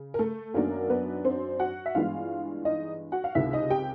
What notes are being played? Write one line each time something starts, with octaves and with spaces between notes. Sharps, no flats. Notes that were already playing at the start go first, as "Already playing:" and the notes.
Already playing: C#3
A#4
A3 A4
F#2 D#3 F#3 A#3 B3 D4 A#4
B3 B4
C4 C5
F#4 F#5
E5
G2 E3 G#3 B3 E4 F4 F5
D#4 D#5
F#4 F#5
F5
C#2 C3 D#3 E4 E5
D#4 D#5
G4 G5